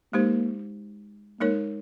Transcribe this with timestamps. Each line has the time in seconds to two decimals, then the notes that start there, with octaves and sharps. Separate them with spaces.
0.13 G#3 A#3 D#4 G4 C5
1.40 G#3 A#3 D#4 A#4 C#5